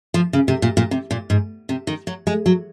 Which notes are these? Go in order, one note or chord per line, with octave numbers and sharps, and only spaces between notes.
F3
C#3
C3
A#2
A#2
C3
A#2
G#2
C3
D#3
F#3
G#3
F#3